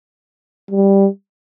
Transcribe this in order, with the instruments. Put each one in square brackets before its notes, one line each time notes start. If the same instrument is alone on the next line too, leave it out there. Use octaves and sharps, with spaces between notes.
[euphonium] G3